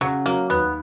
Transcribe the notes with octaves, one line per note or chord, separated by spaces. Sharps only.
C#3 F#3
F#3 A#3
D#2 B3